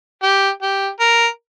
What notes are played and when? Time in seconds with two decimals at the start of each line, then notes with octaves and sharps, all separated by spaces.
0.23 G4
0.62 G4
1.00 A#4